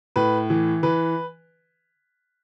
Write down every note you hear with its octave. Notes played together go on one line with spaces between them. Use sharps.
A2 B4
E3
E3 B4